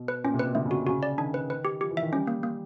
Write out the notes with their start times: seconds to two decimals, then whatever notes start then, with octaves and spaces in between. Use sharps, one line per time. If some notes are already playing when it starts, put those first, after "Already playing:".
Already playing: B2
0.08 B4
0.24 A#2 C#4
0.34 C3
0.39 B2 B4
0.55 D3 A3
0.65 C#3
0.71 F#4
0.76 C3
0.87 C#3 F#4
1.03 D5
1.18 D#3 D4
1.34 B4
1.50 B4
1.65 G4
1.81 F3 G4
1.91 E3
1.97 E5
2.02 D#3
2.12 G3 C#4
2.27 A#3
2.43 A#3